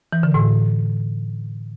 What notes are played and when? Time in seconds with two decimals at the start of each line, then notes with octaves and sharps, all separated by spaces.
0.13 E3
0.23 D3
0.34 A2